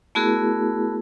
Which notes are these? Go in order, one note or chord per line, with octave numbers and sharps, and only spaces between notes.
A3 B3 E4 F#4 G#4 A#4